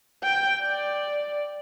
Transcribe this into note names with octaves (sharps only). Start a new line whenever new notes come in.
G5
D5